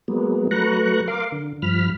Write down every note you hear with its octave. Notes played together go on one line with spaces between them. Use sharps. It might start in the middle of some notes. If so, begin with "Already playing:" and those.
F#3 G#3 A#3 B3
F#3 A3 B4 A#5 C#6 F#6
A#4 F5 C6 D6
D3
G2 F3 B5 F6